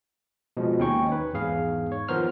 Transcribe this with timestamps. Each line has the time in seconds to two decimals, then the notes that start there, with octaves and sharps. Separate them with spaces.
0.57 B2 F3 G#3
0.79 D#2 C#4 D#4 G5 C#6
1.09 B4 C#5
1.33 E2 G#2 G#4 F5
1.92 C#5
2.08 D#3 F3 B3 A#4 C5 F6